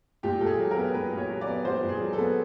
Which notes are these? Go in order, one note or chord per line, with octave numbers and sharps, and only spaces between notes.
A#2 G4
A#2 A4
G#4
F#3
A#4
B3
A#2 B4
A#2
C#5
F#3
D5
B3
A#2 C5
A#2
G#4
F#3
A4
B3